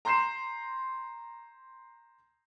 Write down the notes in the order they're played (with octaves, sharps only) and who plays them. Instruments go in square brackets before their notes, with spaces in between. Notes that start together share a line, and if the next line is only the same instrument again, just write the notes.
[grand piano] A#5 C6 G6 C7 E7